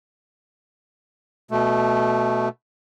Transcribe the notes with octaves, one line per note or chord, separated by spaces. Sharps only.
B2 A3